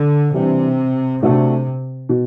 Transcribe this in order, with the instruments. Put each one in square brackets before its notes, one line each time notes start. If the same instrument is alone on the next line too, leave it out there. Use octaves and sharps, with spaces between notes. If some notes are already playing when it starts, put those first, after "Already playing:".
Already playing: [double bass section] D3
[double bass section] C3 [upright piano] E3 G3 D4
[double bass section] C3 [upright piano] A3 D4 F#4 A4
[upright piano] B2